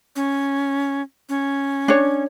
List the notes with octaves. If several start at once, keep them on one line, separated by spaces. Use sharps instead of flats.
C#4
C#4
D4 C#5